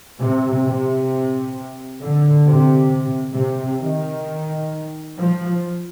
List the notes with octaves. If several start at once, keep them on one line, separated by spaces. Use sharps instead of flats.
C3
C3
D3
C3
C3
D#3
F3